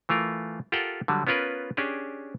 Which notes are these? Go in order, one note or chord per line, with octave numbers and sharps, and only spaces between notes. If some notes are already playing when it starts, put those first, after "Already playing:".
E3 A3 F4 A#4
F4 G4 A4 A#4 F#5 G5
D3 F#3 G3
B3 C#4 F4 A#4 B4
C#4 D4 G4 G#4